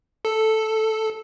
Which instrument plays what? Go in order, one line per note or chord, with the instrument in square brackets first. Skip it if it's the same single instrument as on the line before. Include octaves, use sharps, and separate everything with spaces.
[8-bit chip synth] A4